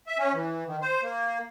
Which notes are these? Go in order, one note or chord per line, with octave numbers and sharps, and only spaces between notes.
E5
C#4
E3
D#3
C5
A#3